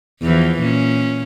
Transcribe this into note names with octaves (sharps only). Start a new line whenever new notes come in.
E2 E3 F3
A#2 C#4